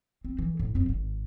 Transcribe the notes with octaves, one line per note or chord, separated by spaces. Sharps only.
C4
E3
A2
F#2 C4
G#1